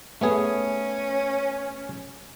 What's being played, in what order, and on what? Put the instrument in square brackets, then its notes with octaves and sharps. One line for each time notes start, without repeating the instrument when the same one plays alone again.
[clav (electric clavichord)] A3 B3 G#4 [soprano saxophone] C#4